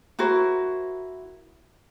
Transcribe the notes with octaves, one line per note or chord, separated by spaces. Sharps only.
E4 F#4 A#4 C5